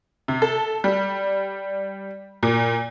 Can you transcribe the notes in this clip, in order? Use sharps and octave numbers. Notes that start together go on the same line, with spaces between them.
C3
A4
G3
A#2